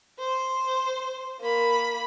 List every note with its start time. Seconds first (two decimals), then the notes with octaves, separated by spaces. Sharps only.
0.19 C5
1.40 A#3 B5